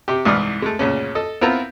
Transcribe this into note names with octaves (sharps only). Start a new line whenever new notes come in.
C3 G4
C2 G#2 E3 D5 D#6 F6
G#3 A3
D2 A#2 C#3 C#4
A4 D#5
B3 C4 E4 F4 A#4 A#5